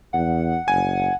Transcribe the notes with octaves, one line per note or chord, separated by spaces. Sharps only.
E2 F#5
F#1 G#5